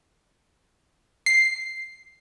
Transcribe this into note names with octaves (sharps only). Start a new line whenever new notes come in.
C7